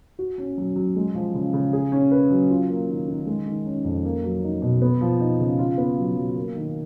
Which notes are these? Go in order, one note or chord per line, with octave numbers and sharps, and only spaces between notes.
F#4
C#4
F#3
F#3
G#3
F3
C#3
C#3
G#4
C#4
B4
F#3
F4
A#3
D#3
D#3
G#3
D#3
C#4
F2
A#3
F#3
D#4
B2
B3
F3
D#4
C#3
F4
B3
F#3
F#3
A#3
D#3